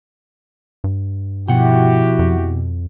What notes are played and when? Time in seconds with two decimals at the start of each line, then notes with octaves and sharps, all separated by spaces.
0.84 G2
1.48 B2 F3 E4 F#4 G4 F#5 G5
2.19 F2